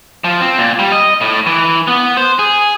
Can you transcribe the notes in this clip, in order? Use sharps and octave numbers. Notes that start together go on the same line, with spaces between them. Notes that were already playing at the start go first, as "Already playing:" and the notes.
F3
C4
A#2
G3
D#5
A2
E3
B3
C5
G#4